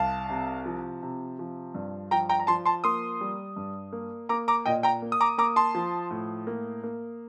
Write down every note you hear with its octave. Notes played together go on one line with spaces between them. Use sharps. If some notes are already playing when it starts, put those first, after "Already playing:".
Already playing: C2 F5 A5
C3
F3
C3
F3
G2
F3 G5 A#5
G5 A#5
A#5
F3 A5 C6
A5 C6
A#3 C6 D#6
G3
G2
A#3
A#3 A#5 D6
A#5 D6
A#2 D#5 G5
G5 A#5
A#3
D#6
A#5 D6
A#3 A#5 D6
A5 C6
F3
A2
A#3
A#3